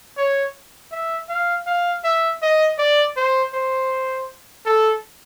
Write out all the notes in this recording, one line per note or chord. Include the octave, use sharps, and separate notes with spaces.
C#5
E5
F5
F5
E5
D#5
D5
C5
C5
A4